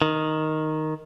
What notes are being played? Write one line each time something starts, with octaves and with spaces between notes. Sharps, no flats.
D#3